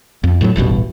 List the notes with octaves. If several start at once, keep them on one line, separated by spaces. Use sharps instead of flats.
F2
A2 D3 F#3
D#1 A1 G2 B2